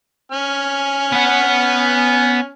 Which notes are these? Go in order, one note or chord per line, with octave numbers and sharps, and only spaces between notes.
C#4 G#5 F6
B3 F#5